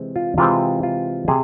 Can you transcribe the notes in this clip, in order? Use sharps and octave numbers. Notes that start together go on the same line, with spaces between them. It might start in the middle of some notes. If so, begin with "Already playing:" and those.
Already playing: C3 E3 G#3 C4
F4
C3 E3 G#3 C4 F4
F4
C3 G#4